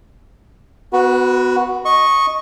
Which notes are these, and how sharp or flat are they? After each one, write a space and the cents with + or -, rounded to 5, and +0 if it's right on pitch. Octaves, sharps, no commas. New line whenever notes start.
B3 +20 F#4 +0 B4 -35
D#5 +0 C#6 -10